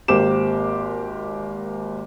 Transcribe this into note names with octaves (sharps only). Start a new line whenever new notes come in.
G#1 A#3 G4 C5 D6 E7